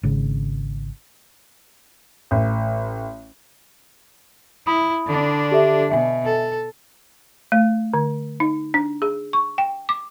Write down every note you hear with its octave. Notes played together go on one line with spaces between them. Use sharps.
G#1 C#3
A1
E4 B5 D#6
D3 D4
G4 A4 E5
B2 E5 G#5
A4
A3
D3
D#4
D4
G#4
C#6
G5
D6